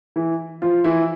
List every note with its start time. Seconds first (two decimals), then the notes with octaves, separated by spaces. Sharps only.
0.16 E3 E4
0.62 F3 F4
0.84 E3 E4